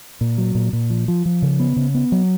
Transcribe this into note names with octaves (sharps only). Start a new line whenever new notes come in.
A#2
F#3
A#2
A#2
F3
F3
F3
C#3
B3
C#3
B3
F#3